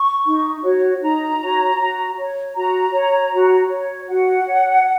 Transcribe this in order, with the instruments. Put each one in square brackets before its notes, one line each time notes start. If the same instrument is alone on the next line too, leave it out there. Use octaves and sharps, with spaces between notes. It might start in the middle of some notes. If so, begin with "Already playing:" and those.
Already playing: [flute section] C#6
D#4
F#4 C#5
D#4 A#5
F#4 C#5
F#4
C#5
F#4 A#5
C#5
F#4
C#5
F#4 F#5
C#5